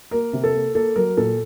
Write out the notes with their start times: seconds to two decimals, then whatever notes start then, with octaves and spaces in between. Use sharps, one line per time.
0.11 A#3 A#4
0.33 C3
0.44 A4
0.54 A#3
0.75 A#3 A4
0.96 F#3 A#4
1.17 A#2 A4